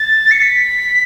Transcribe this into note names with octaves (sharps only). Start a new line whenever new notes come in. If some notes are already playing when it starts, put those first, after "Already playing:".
Already playing: A6
C#7
B6